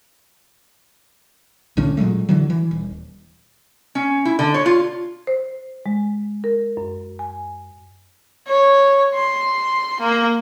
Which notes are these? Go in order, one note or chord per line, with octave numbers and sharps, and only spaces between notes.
B1 A2 D3 C#4
A#2 F#3 G#3 A3
D3 E3 F#3
E3
D#1
C#4
E4
D3
C#5
F4
C5
G#3
A#4
F#2
G#5
C#5
C6
A#3